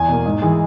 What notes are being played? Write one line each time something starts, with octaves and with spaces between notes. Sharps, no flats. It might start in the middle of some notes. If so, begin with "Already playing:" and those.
Already playing: E2 G#5
B2 A#3
G#2
E3 G#3